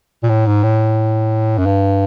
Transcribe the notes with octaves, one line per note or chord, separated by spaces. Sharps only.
A#2
A2
G#2
A2
F#2
G2